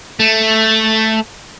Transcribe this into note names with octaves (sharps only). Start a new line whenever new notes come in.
A3